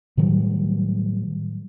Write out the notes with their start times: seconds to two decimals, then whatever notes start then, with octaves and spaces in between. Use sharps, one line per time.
0.17 A2 D#3 F#3 G3